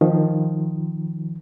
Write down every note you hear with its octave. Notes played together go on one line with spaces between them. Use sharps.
D#3 F3